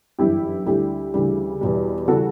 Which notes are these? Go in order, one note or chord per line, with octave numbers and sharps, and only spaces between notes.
G1 F#2 E3 E4 G4
D2 D3 G3 E4 G4
D2 C#3 E3 G3
E2 B2 G3
C#3 E3 G3 F#4 A4